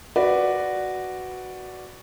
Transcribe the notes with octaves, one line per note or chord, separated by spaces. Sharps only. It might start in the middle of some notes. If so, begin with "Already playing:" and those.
F#4 B4 D5